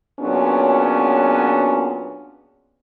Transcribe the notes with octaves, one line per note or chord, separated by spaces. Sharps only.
A#2 F#3 B3 C#4 D4 G#4